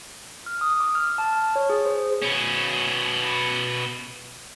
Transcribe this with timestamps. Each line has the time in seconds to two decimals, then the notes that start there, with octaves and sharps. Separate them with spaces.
0.46 F6
0.61 D#6
0.80 D6
0.95 F6
1.18 A5
1.32 F6
1.56 C#5
1.70 G#4
1.86 C5
2.22 B2 C#4